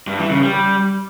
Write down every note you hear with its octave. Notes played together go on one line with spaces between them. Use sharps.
G2
E3
C#3
G3